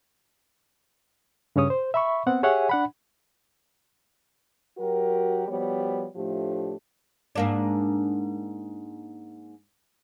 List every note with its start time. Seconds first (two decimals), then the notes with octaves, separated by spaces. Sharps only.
1.56 G2 C#3 C#4 C#5 D#6
1.70 C5
1.94 E5 B5 C#6
2.26 B3 C4 F#5
2.43 G4 G#4 C#5 E5 F#5 G#5
2.69 D4 F#5 B5
4.78 F#3 F#4 G4 A#4
5.48 F3 G3 B3 F#4 C#5
6.15 A2 F3 A3 D4 G4
7.36 G#2 A#3 D4